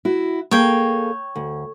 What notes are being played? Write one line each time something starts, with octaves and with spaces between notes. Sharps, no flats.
E4 F#4
A#3 G#4 A4 C#5 G5
D2